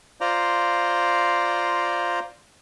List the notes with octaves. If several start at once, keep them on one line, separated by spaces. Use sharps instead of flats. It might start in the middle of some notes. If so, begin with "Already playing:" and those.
F4 C5 D5 A#5